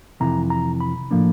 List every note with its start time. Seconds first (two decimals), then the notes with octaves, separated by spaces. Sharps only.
0.20 F2 C3 E3 A#5
0.50 A#5
0.80 B5
1.11 A2 F3 A#3 D4